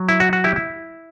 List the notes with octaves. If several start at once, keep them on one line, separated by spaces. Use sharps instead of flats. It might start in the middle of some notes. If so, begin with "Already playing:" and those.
Already playing: F#3
E4
F#4
F#4
E4 G4
E4